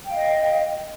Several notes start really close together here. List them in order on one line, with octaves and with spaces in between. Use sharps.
G5 F5 D#5